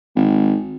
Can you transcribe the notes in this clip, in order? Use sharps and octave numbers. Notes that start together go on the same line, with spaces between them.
G#1